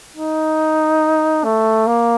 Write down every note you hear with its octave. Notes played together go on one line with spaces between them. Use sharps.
D#4
A3
A#3